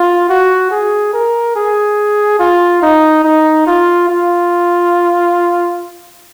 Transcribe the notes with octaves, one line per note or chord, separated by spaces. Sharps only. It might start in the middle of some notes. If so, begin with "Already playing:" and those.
Already playing: F4
F#4
G#4
A#4
G#4
F4
D#4
D#4
F4
F4